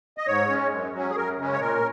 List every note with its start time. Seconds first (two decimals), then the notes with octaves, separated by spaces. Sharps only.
0.18 D#5
0.27 G#2 C#5
0.49 G#3 C#4
0.71 F#2
0.94 F#3 C#4
1.10 G#4
1.16 F#2 A#4
1.38 C#3 G#3 C#4
1.53 C#5
1.60 A#2 A#4